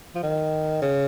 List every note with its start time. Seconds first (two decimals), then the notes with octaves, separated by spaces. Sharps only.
0.15 F3
0.23 D#3
0.82 C#3